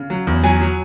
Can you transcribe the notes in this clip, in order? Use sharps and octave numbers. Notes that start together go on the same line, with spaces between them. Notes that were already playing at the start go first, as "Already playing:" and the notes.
Already playing: C#3
F#3
E2
F#3 G#5
F#3